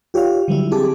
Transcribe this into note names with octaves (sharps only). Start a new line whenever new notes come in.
F4 G4 C#5 D5 F5
D3 F#3 G3 E4
C4 G4 G#4 A5 D6